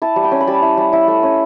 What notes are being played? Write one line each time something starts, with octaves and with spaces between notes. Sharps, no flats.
E4 A5
G3
G5
C#4
B5
G3 A5
E4
G3
E4
A3
C#4